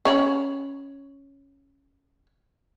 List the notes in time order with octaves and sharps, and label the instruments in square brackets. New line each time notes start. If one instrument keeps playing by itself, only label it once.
[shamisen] C#4 C#5 B5